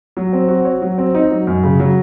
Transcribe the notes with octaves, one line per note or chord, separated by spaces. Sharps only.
F#3
C4
F#4
C#5
F#3
C4
D#4
F#3
F#2
C#3
F#3